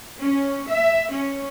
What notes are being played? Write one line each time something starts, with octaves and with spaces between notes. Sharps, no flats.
C#4
E5
C#4